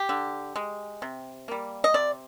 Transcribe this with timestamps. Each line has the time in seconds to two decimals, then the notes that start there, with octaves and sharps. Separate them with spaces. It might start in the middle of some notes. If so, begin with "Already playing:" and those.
Already playing: G4
0.09 D3
0.56 G#3
1.02 C3
1.48 G3 A#3
1.84 D#5
1.94 C3 D5